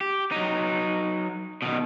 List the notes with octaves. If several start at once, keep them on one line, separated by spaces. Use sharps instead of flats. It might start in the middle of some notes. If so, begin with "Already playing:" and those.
G4
F#3 D#4
B2 D#3